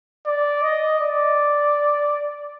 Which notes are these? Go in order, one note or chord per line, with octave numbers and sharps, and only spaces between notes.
D5
D#5
D5